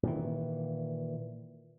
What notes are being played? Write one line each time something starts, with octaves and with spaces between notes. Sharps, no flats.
A#2 D#3 E3